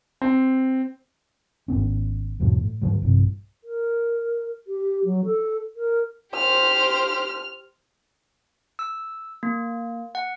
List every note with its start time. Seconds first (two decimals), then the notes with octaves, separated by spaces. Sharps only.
0.22 C4
1.68 G#1 G#2 B3 C#4
2.40 E2 G#2 B2 F#3
2.61 A2
2.82 G#2 D3 F#3 G3
3.02 A#1 G2 C3
3.64 A#4
4.67 G4
5.05 F#3
5.25 A4
5.77 A#4
6.35 G4 C5 F6
8.79 E6
9.43 A#3
10.15 F#5